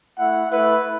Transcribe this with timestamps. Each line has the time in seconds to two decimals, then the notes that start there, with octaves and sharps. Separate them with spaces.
0.17 A3 E4 F#5
0.50 A3 E4 B4